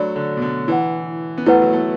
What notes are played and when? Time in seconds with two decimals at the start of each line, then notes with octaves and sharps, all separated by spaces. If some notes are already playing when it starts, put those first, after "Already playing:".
Already playing: F#3 A3 D4 F#4 D5 B5
0.16 D3
0.37 B2
0.42 D3
0.68 E3 E4 B4 F#5
1.38 B3
1.46 A3 E4 B4 F#5
1.62 F#3
1.73 A3